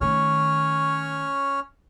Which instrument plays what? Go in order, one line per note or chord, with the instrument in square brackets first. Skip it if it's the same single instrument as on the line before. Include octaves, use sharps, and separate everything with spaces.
[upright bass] D#3 A3 [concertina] C#4 C#5 F6